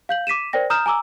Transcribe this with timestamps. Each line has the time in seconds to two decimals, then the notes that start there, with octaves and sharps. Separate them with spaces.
0.09 F5 G6 F#7
0.27 D6 B6 D#7 E7
0.53 A#4 C5 D5 G5 A#6
0.70 A#5 D#6 F6 G6 E7
0.86 G#5 A#5 D6 E6